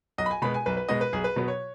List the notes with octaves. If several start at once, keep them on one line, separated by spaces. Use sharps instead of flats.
B1 D#5
B5
G#5
B2 G#3 B3 B5
G#5
B1 B4
B4
B2 G#3 B3 D#5
B4
B1 G#4
B4
B2 F#3 B3
C#5